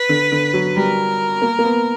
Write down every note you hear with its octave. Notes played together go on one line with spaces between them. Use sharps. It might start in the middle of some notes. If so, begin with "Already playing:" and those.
Already playing: B4
D3
D3
F#3
G3 A#4
A#3
A#3
B3